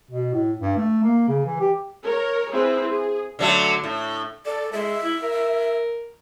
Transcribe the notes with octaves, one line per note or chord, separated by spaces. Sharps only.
B2
A2
G2
A3
A#3
C#3
E3
G4
A#4 C#5
C4 E4 G#4 B4
G#4
D3 F#3 A3
A2
A4 D5
G#3 E5
E4
A#4